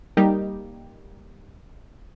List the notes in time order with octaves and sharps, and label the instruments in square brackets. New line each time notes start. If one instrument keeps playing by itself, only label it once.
[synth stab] G3 A#3 D#4 G4